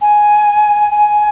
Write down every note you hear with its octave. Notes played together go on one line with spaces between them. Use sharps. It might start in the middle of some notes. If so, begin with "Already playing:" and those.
G#5
G#5